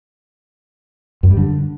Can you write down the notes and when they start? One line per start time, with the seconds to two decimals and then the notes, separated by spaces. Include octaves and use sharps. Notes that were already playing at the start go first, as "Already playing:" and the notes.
1.23 F#2
1.30 G3
1.37 D3